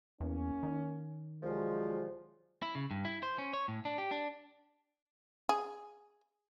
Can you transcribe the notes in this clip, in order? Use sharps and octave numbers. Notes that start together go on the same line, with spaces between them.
E2 A#3 C#4
D#3
C2 F3 F#3 G#3
E4
C#3
G2
E4
C5
C#4
C#5
A2
D4
G4
D4
G#4